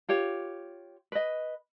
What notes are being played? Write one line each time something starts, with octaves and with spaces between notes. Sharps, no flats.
F4 G4 C#5
B4 D#5